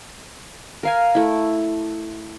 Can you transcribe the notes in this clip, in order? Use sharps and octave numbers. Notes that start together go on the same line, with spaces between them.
A#4 F5 G#5
A3 E4